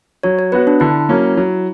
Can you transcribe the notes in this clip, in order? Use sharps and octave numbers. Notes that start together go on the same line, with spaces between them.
F#3 C#5
C#5
B3 F#4 B4
D4
D3 E4
F#3 A#3 C#4
F#3